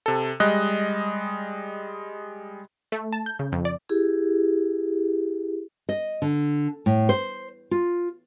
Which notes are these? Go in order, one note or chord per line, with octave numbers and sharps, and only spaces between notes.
C3 A4
G3 G#3 D#5 F#6
A3
A5
G6
C#3
F2
D5
E4 G4 G#4
D#5
D3
A2
C5
F4